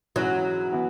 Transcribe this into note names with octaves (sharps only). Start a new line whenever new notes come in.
G#2 E3 F#3 C#4 E4
E3 B3 E4